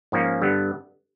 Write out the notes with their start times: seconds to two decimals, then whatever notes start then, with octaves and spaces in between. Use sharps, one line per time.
0.12 G#2 F3 A#3 C#4
0.41 G2 D3 G3 B3